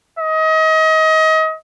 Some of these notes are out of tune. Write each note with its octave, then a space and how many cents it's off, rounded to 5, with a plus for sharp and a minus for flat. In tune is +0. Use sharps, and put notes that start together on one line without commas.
D#5 +30